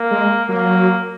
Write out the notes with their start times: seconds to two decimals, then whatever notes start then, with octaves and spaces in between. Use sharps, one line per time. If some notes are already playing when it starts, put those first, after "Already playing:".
Already playing: A#3
0.11 G#3
0.49 F#3 A#3